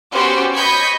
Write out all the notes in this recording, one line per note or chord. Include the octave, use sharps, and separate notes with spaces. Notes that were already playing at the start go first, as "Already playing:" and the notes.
B3 C#4 F#4 G4 C5
D#5 B5 C#6 G6 G#6 B6